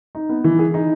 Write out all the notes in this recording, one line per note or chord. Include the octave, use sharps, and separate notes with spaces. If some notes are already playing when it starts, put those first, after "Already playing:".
D#4
B3
E3
G#4
D#4